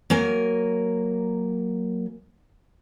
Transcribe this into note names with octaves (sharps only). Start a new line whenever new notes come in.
F#3 A#3 A#4 G#5